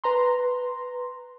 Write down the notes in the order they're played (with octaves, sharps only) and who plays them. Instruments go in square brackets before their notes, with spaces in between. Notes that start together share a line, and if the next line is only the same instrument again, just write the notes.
[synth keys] B4 A#5 C6